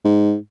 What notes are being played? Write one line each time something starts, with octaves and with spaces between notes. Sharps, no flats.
G#2